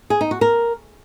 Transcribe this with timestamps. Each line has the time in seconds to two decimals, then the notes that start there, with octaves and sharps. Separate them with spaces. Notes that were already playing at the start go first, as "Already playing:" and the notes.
0.10 G#4
0.21 D#4
0.31 F#4
0.41 A#4